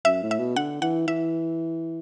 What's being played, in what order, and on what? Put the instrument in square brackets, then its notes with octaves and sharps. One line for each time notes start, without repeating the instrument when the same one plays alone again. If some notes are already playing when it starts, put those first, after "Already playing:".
[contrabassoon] F#2 [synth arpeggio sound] E5
[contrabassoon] A2
[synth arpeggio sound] E5
[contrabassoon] B2
[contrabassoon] D3 [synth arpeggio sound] F#5
[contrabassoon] E3 [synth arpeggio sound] F#5
[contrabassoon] E3 [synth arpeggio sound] E5